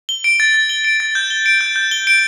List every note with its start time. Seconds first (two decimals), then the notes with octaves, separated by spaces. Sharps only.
0.09 G7
0.24 D7
0.40 A6
0.54 A6
0.69 G7
0.84 D7
1.00 A6
1.15 G6
1.30 G7
1.46 D7
1.61 G6
1.76 G6
1.91 G7
2.07 D7